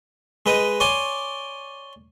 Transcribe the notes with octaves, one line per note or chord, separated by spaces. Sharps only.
G#3 B4 D#5
C#5 D5 G#5 C6 D6